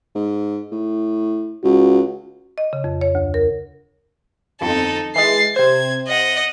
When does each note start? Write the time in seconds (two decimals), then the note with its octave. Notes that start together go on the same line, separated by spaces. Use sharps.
0.15 G#2
0.72 A2
1.64 C#2 F#4
2.58 D#5
2.73 C#3
2.84 F2
3.01 C#5
3.15 D2
3.34 A#4
4.61 G1 F2 D#4 A4
5.15 E3 G#3 A6 C7
5.56 C3 C5 G#6
6.08 D#5 F#5